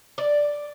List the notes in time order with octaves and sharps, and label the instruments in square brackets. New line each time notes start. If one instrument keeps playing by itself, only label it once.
[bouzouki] D5